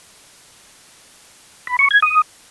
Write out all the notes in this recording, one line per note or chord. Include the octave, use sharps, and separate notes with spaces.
B5
C#6
G#6
D#6